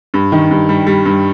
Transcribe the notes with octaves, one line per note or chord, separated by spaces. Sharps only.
G2
D#3
G2
G3
G3
G2